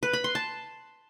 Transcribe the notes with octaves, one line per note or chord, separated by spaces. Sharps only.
B4
B5
C6
A5